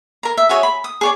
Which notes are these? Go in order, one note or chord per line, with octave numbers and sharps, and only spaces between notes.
A#4 A#5
E5
F#4 G#4 C#5 E5
B5
D#6
G#4 C#5 D5